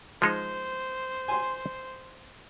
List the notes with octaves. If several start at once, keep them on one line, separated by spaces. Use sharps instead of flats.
F3 G#3 D#4 C5
G#5 C6